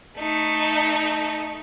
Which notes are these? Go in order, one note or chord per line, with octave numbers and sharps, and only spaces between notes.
A3 D#4